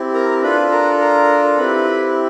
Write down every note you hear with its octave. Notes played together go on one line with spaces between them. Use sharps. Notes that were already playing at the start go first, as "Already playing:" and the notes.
Already playing: C4 E4 G4
A#4 A#5
D4 F4 A4 B4 B5
A#4 A#5
A#4 A#5
C4 E4 G4 B4 B5